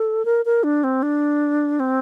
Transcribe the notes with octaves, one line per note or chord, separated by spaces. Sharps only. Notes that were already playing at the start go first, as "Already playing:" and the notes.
Already playing: A4
A#4
A#4
D4
C4
D4
C4